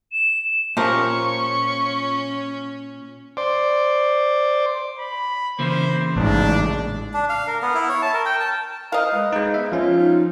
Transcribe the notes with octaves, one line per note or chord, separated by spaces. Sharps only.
E7
A#2 F3 C#4 G4 A#4 C#6
C5 D5
B5
C#3 E3 A#3 C5
A1 G#2 D4
D4
F5
A#4
B3
E4
C#5
A5
A#4
G5
A5
A#4 C5 D#5 F5
G#3 B4
G#3 D#4 C5
B3 E5
F3 C#4 F4 C#5
D#4